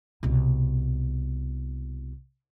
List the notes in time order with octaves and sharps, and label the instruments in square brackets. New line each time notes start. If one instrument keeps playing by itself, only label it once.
[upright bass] C2 B2